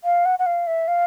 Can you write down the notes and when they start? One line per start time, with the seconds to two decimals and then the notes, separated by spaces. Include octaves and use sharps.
0.04 F5
0.25 F#5
0.39 F#5
0.46 F5
0.67 E5
0.88 F5